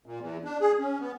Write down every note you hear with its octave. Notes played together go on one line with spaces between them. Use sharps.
A#2
E2
D4
G#4
C#4
B3